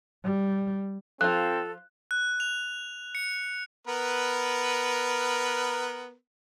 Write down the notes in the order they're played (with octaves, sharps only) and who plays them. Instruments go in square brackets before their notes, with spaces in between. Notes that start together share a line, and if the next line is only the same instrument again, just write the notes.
[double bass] G3
[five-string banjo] F3 F4 [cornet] C4 [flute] A4 [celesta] F#6
[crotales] F#6
F7
C#7
[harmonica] B3 A#4 B4